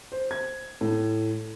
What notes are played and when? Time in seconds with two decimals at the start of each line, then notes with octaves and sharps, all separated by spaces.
0.12 C5
0.31 G#6
0.81 A2